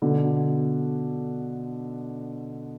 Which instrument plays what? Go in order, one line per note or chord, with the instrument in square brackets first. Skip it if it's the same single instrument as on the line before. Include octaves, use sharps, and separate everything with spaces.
[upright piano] B2 D3